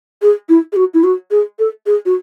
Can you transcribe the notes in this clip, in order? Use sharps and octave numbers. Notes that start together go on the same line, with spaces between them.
G#4
E4
G#4
F#4
E4
F#4
G#4
A4
G#4
F#4